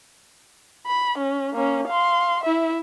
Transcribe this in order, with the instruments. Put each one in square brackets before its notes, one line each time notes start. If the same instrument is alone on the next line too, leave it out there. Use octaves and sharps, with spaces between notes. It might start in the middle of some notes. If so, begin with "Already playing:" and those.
[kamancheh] B5
C#4
A#3 C#4
F5 C6
E4 E5